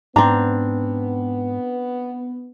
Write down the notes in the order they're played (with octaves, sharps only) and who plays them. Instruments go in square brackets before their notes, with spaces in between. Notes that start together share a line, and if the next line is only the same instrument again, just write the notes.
[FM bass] G#2 [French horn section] B3 [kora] C4 D4 [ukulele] A#5